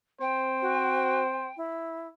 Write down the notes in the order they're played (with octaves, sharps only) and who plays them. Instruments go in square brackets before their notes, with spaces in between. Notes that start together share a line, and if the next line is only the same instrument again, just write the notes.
[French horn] C4 [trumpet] C5 [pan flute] G5
[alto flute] F#4
E4